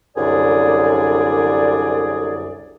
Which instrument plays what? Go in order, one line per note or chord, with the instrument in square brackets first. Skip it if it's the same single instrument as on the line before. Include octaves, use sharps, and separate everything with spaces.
[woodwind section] C2 F#2 D3 G#4 D5